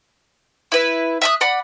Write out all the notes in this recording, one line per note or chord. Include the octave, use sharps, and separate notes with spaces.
E4 B4
E5 D#6 F#6
D5 F#5 B5